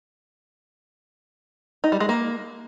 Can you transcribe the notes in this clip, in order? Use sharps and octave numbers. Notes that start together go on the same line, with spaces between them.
D#4
G3
G#3
A#3